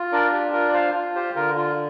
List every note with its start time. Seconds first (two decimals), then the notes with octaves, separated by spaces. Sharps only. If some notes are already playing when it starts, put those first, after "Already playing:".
Already playing: F4
0.13 D4 A#4 D5
0.32 G4
0.53 F4 A#4
0.69 D5
0.74 C5 F5
0.95 F4
1.15 G4 C5
1.35 D3 F4 A#4
1.57 F4